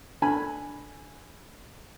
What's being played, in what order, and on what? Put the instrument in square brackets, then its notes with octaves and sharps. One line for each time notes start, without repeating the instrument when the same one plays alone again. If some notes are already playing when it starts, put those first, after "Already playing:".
[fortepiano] D3 G#5 B5